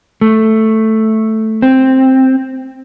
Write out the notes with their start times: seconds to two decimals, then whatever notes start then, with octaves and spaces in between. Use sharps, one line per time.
0.21 A3
1.62 C4